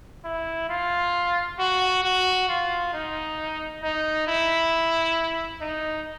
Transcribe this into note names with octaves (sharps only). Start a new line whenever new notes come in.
E4
F4
F#4
F#4
F4
D#4
D#4
E4
D#4